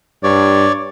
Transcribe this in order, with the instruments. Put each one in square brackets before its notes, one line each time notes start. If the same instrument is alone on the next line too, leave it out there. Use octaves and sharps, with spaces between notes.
[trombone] G2 [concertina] C#5 D5